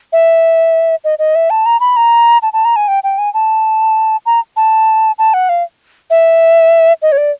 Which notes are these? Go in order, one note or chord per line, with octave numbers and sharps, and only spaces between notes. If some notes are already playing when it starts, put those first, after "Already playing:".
E5
D#5
D#5
E5
A5
A#5
B5
A#5
A5
A5
A#5
G#5
G5
G5
G#5
A5
A#5
A5
A5
F#5
F5
E5
D#5
C#5
D5